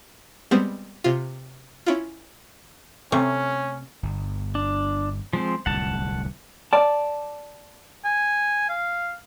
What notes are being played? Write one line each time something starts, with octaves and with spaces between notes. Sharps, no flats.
G3 G#3 B3 C4
C3 F4
C#4 E4 F4
C3 A3 C#4
G1
D4
F3 G#3 C4
D1 C2 F2 F#5 A5
D5 A5
G#5
F5